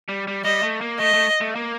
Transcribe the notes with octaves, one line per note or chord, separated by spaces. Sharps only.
G3
G3
G3 D#5
A3
A#3
A3 D#5
A3
A3
A#3